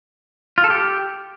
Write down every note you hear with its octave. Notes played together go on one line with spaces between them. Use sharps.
F4
A4
G4